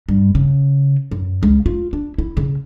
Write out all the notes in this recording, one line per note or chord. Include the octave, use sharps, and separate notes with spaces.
G2
C#3
F#2
C#2
F4
D4
E4
C#3